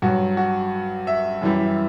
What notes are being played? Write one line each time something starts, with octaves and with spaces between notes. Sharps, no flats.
G2 F#3 F#4
F#4
E5
F#2 E3 G3